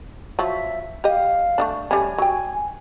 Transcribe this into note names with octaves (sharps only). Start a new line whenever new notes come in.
F3 F#3 E5
G4 D#5 F5
A3 B3 D4
G3 A3 C#4 G#5
F#3 G5